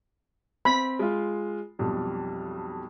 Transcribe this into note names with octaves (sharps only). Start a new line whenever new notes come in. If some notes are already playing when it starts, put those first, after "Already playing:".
C4 B5
G#3 F4
B1 F2 G3